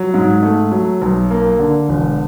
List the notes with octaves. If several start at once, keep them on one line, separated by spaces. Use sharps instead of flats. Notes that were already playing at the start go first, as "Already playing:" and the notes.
Already playing: F#3
G#2
A3
F#3
B1
A#3
D3
E1